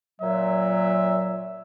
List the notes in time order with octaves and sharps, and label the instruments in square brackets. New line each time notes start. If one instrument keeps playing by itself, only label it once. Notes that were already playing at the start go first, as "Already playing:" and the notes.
[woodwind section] A#2 F#3 [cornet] E5